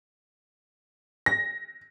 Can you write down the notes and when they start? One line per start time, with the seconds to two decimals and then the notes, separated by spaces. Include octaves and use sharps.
1.26 A#6